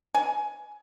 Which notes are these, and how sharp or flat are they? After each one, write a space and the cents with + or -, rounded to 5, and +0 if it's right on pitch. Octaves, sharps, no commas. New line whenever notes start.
G#5 +15